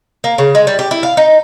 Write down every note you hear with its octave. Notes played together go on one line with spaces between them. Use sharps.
A#3
C#3
G#3
G3
G4
E4
F5
D#4